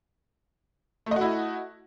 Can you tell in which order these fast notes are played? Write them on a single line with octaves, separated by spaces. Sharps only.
A3 D#5 F#4 E4